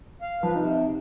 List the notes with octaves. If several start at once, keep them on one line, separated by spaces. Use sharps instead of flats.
F5
F3 B4
C3 D#4